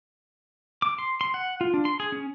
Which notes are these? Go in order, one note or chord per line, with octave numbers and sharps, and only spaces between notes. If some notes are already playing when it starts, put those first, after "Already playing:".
D6
C6
C6
F#5
F4
D4
C6
G#4
C#4